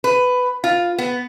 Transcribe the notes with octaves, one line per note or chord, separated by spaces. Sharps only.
B4
F4
B3